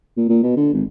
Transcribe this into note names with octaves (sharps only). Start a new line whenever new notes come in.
A#2
A#2
B2
D3
G#1